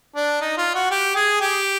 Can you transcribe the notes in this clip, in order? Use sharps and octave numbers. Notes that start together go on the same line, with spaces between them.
D4
D#4
F4
F#4
G4
G#4
G4